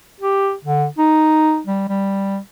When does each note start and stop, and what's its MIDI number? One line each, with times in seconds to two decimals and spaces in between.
0.20 0.53 67
0.65 0.85 50
0.98 1.60 63
1.67 1.87 55
1.89 2.39 55